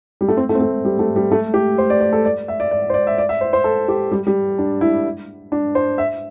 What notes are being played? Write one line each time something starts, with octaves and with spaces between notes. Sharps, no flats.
G3
A3
C4
A3
C4
A3
G3
A3
G3
A3
G4
C5
D5
D5
A4
D5
E5
D5
D5
C5
D5
E5
D5
E5
C5
C5
A4
G4
G3
G3
D4
E4
D4
C5
E5